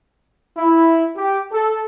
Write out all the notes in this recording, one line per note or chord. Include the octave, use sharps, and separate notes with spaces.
E4
G4
A4